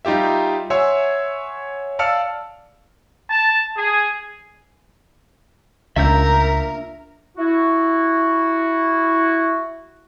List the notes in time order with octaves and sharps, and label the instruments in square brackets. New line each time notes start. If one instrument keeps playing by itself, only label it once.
[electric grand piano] G3 D#4 F4 G4 E5
C#5 E5 F#5 G#5 C6 E6
D5 F5 A5 E6 F6 C#7
[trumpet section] A5
G#4
[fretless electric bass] C#2 [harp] A#3 D4 F4 [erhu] A#4 [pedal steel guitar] E5 E6 G6
[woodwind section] E4 F#4